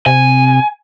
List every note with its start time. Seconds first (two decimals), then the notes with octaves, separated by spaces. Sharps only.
0.06 C3 G#5